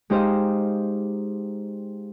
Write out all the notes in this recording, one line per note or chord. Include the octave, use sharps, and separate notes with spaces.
G#3 D#4 G4 C5 D#5 F5